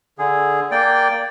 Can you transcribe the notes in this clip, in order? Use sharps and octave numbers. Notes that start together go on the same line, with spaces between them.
D3 G#4
A#3 D5 G5